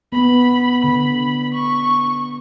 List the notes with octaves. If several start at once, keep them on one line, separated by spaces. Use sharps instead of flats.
B3 B5
D3 B5
C#6